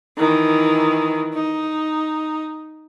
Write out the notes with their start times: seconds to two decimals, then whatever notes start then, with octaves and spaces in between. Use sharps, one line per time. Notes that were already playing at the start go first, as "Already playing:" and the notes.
0.17 D#3 E3
1.34 D#4